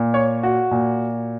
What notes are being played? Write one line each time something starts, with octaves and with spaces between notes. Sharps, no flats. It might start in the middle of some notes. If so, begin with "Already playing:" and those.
Already playing: A#2
C#5
F#4
A#2